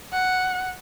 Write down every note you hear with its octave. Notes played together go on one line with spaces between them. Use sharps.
F#5